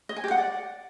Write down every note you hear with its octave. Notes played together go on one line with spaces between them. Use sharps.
D#5
G#5
G4
F#5
D5